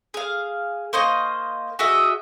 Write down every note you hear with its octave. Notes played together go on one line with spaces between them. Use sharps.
G#4 F5
A#3 C5 D#5 C#6
F#4 G#4 D#5 E5